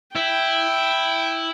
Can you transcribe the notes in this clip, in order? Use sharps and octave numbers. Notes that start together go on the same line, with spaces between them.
E4 G5